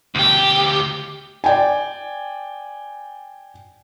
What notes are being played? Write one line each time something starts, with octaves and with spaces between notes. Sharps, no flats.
D2 G4
D5 G5 G#5